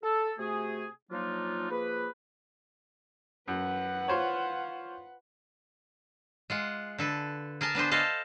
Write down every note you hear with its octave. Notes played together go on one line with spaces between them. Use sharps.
A4
C3 A3 F#4 G#4
F3 F#3 A#3 D4 D#4 F4
F3 A#3 G#4 B4
F#2 B4 F#5
F4 C5 C#5
G#3 F4 F#5
D3 A4 B4
G#4 A#4 G#5 A5
B3 D4 B4 C5
A4 C5 D#5 F5 A5